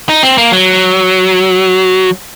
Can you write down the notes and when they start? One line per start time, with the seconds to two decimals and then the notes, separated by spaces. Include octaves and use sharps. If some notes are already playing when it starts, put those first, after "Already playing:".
0.09 D#4
0.23 C4
0.38 A#3
0.52 F#3